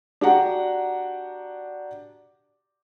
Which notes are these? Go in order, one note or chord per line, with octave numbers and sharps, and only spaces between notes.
D4 F#4 G4 D5 F#5 A#5